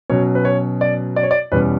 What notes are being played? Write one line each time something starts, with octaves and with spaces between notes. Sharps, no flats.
B2 F#3 C#4 C#5
B4
C#5
D5
D5
C#5
D5
E2 B2 G3 C#4 B4